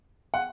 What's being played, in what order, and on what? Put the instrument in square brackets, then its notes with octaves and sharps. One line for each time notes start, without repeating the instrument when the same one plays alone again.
[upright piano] F#5